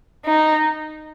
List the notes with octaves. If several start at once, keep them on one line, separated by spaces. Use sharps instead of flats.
D#4